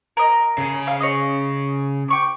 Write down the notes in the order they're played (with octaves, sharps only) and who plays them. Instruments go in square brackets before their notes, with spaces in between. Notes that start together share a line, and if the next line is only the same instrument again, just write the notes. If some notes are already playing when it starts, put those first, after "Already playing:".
[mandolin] A#4 D#5
[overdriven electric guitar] C#3 G#4
[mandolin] F5
C#5 D#5
G5 C#6 D6